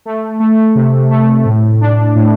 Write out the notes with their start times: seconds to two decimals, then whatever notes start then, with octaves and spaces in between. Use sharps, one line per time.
0.06 A3
0.40 A3
0.75 C3
1.11 A3
1.45 A2
1.81 D4
2.16 A2